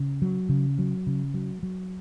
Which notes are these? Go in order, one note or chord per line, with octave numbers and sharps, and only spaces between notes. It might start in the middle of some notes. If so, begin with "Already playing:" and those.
Already playing: C#3
F#3
C#3
F#3
C#3
F#3
F#3